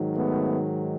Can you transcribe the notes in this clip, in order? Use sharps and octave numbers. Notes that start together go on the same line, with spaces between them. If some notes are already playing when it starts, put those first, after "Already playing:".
Already playing: G#2 D#3 F#3
A3 B3